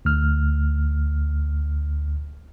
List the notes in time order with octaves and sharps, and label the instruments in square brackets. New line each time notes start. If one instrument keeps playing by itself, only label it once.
[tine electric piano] D2 F6